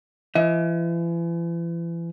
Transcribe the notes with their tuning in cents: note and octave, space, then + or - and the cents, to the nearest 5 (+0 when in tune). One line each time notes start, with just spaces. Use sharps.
E3 +40 D#5 +45